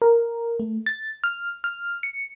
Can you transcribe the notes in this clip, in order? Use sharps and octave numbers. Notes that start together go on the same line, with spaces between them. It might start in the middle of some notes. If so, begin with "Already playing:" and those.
A#4
A3
A6
F6
F6
C#7